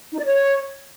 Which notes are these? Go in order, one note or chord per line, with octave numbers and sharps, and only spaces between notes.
D#4
D5
C#5